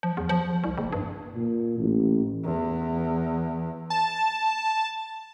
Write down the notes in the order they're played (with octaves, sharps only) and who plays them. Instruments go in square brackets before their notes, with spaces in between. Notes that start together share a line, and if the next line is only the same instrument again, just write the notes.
[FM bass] F3
E2
F3
C2
F#1
G2
[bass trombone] A#2
A1
[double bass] E2
[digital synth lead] A5